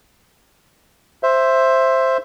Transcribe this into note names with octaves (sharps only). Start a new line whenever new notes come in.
C5 E5